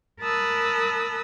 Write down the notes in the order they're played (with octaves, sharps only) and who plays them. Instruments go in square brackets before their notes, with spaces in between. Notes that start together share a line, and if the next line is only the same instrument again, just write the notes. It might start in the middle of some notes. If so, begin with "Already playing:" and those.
[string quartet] A#4 A5 B5 D#6 E6 F#6